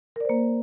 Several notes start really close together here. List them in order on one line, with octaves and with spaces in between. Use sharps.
A#4 D5 C5 A#3